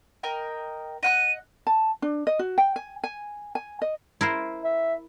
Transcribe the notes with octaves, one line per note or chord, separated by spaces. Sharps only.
A#4 D#5 G5
D#5 F#5 F#6 D#7
A5
D4
D#5
F#4
G5
G#5
G#5
G#5
D#5
E4 A#4 C5
E5